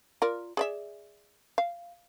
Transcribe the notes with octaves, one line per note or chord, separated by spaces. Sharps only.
F4 A#4 D5
G#4 D5 E5
F5